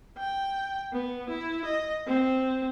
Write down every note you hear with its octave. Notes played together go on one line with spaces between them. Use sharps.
G5
B3
E4
D#5
C4